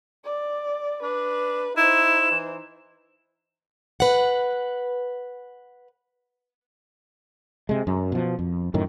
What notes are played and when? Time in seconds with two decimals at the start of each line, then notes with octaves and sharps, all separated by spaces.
0.25 D5
1.03 D4 B4
1.77 D#4 E4 C5 E7
2.31 E3
4.00 B4 F#5
7.69 C3 G#3
7.87 F#2
8.12 B2 F3
8.39 F2
8.74 F#2 A2 D#3